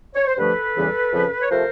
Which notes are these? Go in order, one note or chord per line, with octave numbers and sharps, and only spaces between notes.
C#5
C5
G2 D3 F3 A3 A4 B4
E2 C#3 E3 G3
F2 C#3 F3
C#5
C3 F3 A3 A#4 C5